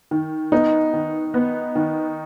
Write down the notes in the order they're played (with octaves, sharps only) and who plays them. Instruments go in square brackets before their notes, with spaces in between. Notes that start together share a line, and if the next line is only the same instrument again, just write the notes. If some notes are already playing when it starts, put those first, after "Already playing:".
[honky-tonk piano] D#3
[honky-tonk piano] B3 [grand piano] D#4
[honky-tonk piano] D#3
B3
D#3